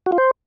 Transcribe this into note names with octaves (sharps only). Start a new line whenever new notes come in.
F#4
F4
C5